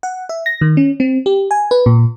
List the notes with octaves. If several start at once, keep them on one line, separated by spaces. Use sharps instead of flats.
F#5
E5
A#6
D#3
C#4
C4
G4
G#5
B4
A#2